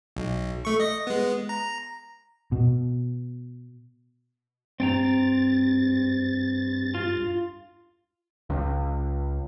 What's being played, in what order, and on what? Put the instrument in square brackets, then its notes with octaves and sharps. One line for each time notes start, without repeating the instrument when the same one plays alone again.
[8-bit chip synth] B1
A3 C#6
D#5 A#6
G#3 B3
A#5
[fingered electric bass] B2
[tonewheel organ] G2 A6 [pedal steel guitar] C4 G5 A#5
[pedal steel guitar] F4
[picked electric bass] C#2